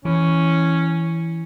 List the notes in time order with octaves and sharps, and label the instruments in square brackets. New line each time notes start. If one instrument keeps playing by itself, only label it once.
[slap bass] E3 [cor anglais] C#4